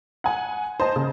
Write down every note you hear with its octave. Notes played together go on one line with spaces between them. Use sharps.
F#5 G#5
C5 D#5 A5
C#3